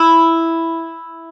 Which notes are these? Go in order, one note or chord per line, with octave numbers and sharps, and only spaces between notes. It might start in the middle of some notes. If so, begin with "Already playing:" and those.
Already playing: E4